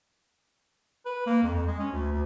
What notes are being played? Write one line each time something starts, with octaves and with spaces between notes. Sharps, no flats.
B4
A#3
F2
F2
G#3
C#4
D2
D2